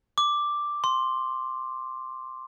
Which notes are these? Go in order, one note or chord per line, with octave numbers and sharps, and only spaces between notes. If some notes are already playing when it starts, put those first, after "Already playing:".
D6
C6